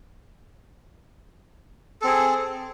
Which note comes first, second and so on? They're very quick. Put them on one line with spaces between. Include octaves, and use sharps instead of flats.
A4 C4 G#4